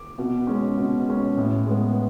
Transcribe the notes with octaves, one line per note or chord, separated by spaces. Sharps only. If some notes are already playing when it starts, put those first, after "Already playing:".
Already playing: D6
B2
G#3 C#4
B2
G#3 C#4
A2
G#3 B3